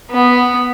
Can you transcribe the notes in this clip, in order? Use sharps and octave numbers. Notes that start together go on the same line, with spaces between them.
B3